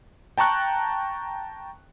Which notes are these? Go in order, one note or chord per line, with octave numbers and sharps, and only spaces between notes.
G5 A5 A#5 C#6 F#6